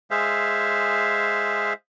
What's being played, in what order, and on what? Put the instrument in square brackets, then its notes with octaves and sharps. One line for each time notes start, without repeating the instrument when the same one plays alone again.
[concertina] G#3 G#4 C5 E5 F5